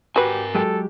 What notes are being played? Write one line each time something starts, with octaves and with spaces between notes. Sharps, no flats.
F#4 G4 A#4 B4 G#5
F#3 G#3 G4 A4